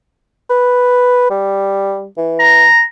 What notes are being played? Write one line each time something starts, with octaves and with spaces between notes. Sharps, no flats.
B4
G3
E3
A#5